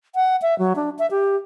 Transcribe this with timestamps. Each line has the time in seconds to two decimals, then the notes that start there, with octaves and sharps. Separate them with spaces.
0.15 F#5
0.42 E5
0.59 F#3
0.76 D4
0.99 E5
1.11 G4